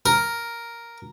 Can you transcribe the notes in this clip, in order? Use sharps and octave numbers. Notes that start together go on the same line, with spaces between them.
A#4